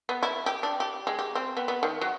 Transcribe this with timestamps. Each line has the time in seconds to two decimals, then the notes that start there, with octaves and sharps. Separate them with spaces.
0.09 B3
0.23 E4
0.46 G4
0.63 D4
0.80 G4
1.07 G#3
1.19 G4
1.35 C4
1.57 B3
1.68 B3
1.83 D#3
2.01 F#3